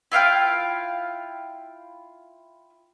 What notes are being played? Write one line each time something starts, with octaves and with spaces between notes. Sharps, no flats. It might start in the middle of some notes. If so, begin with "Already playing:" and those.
E4 F4 F5 G5